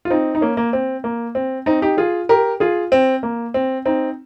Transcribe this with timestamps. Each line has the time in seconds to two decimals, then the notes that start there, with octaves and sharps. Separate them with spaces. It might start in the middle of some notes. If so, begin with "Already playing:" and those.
0.05 F4
0.10 C4 D#4
0.35 D#4
0.41 A#3 C#4
0.57 A#3
0.73 C4
1.04 A#3
1.35 C4
1.66 C4 D#4
1.82 D#4 G4
1.97 F4 G#4
2.29 G4 A#4
2.60 F4 G#4
2.92 C4
3.23 A#3
3.54 C4
3.86 C4 D#4